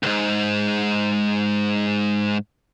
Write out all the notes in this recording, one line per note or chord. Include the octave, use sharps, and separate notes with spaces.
C2 G#2